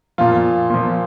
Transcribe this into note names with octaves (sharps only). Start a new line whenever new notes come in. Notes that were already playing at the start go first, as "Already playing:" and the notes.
A#2 F3 F4
A#2 F3